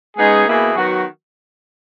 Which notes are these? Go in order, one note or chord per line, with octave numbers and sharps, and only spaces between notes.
C#3 G#3 B3 D#4 G#4
B2 A#3 E4 G#4
D#3 F#3 B3 F#4